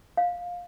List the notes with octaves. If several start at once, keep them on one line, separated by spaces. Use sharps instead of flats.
F5